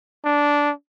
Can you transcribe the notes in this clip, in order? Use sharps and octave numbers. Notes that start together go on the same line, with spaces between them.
D4